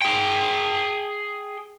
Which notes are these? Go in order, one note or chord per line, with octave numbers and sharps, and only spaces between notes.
G#4 G5